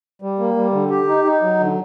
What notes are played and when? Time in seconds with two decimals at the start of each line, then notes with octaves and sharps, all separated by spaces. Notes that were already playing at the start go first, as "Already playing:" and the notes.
0.22 G3
0.39 A#3
0.56 G3
0.73 D3
0.90 G4
1.08 D#4
1.24 D#4
1.42 F#3
1.60 D3